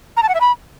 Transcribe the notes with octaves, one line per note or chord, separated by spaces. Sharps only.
A#5
A5
F#5
E5
B5